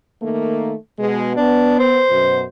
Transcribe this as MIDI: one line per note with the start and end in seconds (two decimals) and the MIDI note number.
0.22 0.74 51
0.22 0.74 57
0.22 0.74 58
0.98 1.32 47
0.98 1.32 56
1.37 2.02 59
1.37 1.79 62
1.79 2.43 72
2.10 2.44 42
2.10 2.44 47